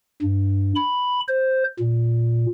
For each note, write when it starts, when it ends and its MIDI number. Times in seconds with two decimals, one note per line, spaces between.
0.22 0.73 43
0.76 1.20 83
1.28 1.64 72
1.79 2.46 46